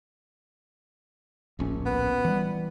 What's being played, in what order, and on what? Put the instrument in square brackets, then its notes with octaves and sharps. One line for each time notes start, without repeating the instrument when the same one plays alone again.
[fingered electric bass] D1 A#1 C#4
[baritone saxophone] B3
[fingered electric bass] E3 G3